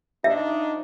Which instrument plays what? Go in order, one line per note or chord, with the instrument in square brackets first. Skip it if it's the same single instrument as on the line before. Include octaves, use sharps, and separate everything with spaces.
[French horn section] F3 D4 D#4 [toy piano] E5